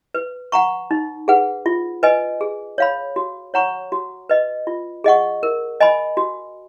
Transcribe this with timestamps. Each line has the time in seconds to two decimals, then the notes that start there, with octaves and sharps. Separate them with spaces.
0.14 B4
0.52 F#5 A#5 C#6
0.91 D#4
1.28 G#4 B4 F#5
1.66 F4
2.03 B4 D#5 G#5
2.41 G#4
2.78 C#5 F5 B5
3.16 F#4
3.54 C#5 F#5 A#5 C#6
3.92 F#4
4.29 B4 D#5
4.67 F4
5.04 G#4 D#5 F#5 C#6
5.43 A#4
5.80 D#5 G#5 B5
6.17 F#4